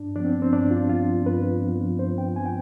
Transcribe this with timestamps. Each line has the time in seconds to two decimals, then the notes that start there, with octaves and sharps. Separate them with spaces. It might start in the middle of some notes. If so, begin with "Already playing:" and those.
Already playing: G2 D4
0.16 F3 B3 D4
0.25 C4
0.42 C4
0.52 G2 D4
0.71 F4
0.89 F3 B3 F4
1.26 G2 B4
1.62 F3 B3
1.99 G2 C5
2.18 G5
2.36 F3 B3 G#5
2.46 G5